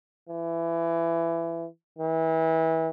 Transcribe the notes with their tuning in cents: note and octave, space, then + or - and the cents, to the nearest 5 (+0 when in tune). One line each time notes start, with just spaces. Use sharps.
E3 +20
E3 -30